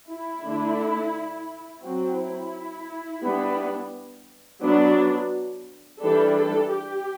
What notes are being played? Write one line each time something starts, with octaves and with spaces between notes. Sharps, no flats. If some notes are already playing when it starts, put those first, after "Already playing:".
E4
D3 A3 D4
F#3 C4 F#4
E4
G3 B3 D4
F#3 B3 D4
E3 G3 D4 A4
A4
G4